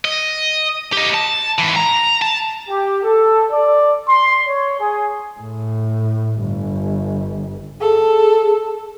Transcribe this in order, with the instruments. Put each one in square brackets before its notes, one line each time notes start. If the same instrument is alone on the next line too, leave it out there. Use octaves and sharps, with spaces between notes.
[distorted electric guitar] D#5
G4 D#5
A5
G#2 E3
A#5
A5
[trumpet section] G4
A4
D5
C6
C#5
G#4
[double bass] A2
G1
[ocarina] G#4 [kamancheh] A4